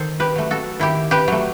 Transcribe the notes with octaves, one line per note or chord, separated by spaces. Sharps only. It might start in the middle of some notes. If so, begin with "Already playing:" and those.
Already playing: D#3 A4 C5
G4 B4
F#3 A3
F#4 A4
D#3 E4 G4
G4 B4
F#3 A3